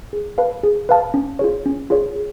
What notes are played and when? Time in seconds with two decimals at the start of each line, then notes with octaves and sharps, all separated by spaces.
0.13 G#4
0.38 B4 F5 A5
0.63 G#4
0.89 B4 F5 A5
1.14 C#4
1.39 F4 G#4 C#5
1.66 C#4
1.90 F4 G#4 C#5
2.16 G#4